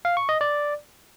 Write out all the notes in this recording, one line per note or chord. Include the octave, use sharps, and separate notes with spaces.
F5
C#6
D#5
D5